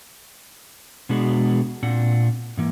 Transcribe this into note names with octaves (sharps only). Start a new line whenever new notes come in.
B2 G#3 B3 D4 F#4 G#4
A#2 C4 D4 F#5
G#2 E3 A#3